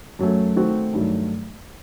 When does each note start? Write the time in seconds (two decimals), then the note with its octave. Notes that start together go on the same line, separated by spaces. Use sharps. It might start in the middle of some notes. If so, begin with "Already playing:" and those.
0.19 F#2 F#3 A3
0.56 D#3 A3 C4 F#4
0.94 G2 D#3 F#3 A3